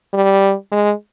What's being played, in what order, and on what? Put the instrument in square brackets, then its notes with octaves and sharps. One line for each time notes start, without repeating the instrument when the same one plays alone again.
[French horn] G3
G#3